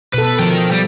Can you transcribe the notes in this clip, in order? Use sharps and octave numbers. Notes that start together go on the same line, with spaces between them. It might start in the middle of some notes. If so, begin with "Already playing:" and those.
B2 A4 B4
F3 A#4 G5
G3